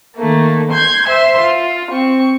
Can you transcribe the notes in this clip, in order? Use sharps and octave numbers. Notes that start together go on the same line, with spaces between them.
D#3 A3 A#3
C6 G6 G#6
C5 E5 C6
F4
C4 C#6